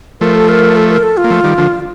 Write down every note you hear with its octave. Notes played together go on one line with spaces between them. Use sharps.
F3 A3 A#4
A4
A#4
A4
A#4
A4
F4
A#3
F3 A3
D#3 G3
D3 F3